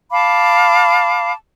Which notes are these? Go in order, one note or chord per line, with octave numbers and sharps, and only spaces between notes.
F5 A5 B5 D6